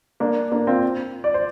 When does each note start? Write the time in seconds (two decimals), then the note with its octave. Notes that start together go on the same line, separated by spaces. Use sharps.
0.20 A#3 D4
0.52 A#3 D4
0.67 C4 F4
1.24 D5
1.34 C5